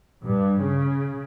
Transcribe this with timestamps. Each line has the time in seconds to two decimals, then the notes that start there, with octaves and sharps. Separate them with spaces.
0.23 G2
0.61 C#3